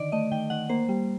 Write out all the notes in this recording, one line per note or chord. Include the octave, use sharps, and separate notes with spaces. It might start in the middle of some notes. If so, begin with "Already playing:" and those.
Already playing: D3 D#3 D5
A3 D#5
D#3 G5
D#3 F#5
A#3 C5
G3